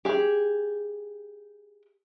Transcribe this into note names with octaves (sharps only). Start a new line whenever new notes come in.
G4 G#4